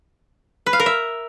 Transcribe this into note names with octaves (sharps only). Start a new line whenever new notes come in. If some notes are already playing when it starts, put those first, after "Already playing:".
B4
F5
A#4
E5